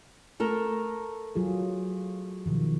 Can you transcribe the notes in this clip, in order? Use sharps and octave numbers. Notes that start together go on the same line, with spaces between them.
A3 A4 A#4
F#3 F4 G#4
B2 D#3 F3